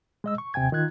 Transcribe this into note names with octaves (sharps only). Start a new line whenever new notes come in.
G#3 D#5 E6
C#6
D#2 C3 G5 G#5 G#6
D#3 D#4 F4 F#6 G#6